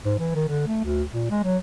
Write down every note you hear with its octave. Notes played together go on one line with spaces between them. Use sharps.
G#2
E3
D#3
D3
A3
D2
A#2
G#3
F#3